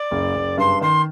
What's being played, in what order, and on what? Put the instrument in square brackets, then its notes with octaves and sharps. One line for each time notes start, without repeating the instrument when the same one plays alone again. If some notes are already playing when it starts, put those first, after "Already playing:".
Already playing: [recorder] D5
[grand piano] F#1
F#1
[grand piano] G2 [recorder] C6
[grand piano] D#3 [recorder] C6